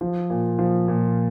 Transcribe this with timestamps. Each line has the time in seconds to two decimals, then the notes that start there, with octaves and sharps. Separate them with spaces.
0.01 F3
0.30 A#2
0.59 F3
0.88 A#2